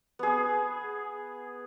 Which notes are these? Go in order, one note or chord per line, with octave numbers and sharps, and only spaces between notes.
B3 G#4